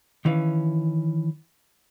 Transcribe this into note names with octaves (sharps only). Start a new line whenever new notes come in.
D#3 E3 C#4 F5